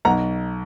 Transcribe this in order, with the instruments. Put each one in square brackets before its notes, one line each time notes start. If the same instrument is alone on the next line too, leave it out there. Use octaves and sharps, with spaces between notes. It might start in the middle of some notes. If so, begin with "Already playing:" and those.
[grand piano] B1 F#5 A#5